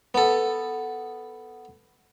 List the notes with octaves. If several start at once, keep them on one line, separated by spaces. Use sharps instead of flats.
B3 A4